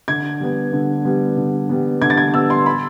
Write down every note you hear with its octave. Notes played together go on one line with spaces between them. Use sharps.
D3 G#6
G3 B3
D3
G3 B3
D3
G3 B3
D3 G#6
A6
G#6
G3 B3 E6
C6
B5